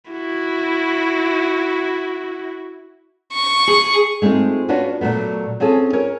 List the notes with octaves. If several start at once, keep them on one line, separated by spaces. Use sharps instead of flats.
E4 F#4
C#6
G#4
G#3 A3 C4 D#4 F4
B3 C#4 D4 F4 F#4 B4
A#2 F#3 A3 B3
C4 C#4 F4 G#4 A4
C#4 A#4 C#5